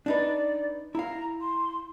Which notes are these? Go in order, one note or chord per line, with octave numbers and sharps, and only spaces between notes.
D4 D#4 B4 D5
E4 F5 A#5
C6